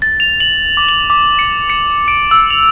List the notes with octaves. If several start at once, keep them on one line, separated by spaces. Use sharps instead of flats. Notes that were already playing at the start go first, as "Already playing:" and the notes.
A6
F7
F#7
D6
F#7
D6
C#7
C#7
D7
E6
F7